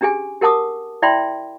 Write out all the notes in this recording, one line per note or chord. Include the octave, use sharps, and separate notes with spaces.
C#4 D4 G4 G#4 G#5
G4 A#4 F#5 A5 D6 D#6
E4 D5 E5 G5 B5 C6